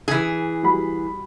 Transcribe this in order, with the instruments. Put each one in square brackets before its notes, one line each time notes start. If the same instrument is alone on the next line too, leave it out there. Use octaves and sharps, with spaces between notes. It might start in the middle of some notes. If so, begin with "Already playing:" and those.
[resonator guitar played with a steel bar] E3 G#4
[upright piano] G3 F#4 B5